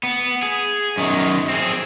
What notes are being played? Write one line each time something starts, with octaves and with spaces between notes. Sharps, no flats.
B3
G#4
F#2 D#3
C4 G#4